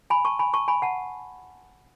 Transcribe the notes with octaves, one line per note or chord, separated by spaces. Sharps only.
G#5 B5
A5 C#6
G#5 B5
A5 C#6
G#5 B5
F#5 A5